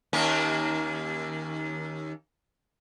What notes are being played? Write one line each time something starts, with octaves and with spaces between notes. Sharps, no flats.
D#2 A#3 C#4